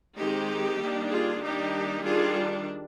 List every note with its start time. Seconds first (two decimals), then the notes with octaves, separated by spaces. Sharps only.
0.18 D#3 G#3 C4 D#4 G4
0.79 D#3 G3 A#3 D4
1.10 F4 G#4
1.41 D#3 G3 A#3 D4 D#4 G4
2.03 D#3 G3 D4 F4 G#4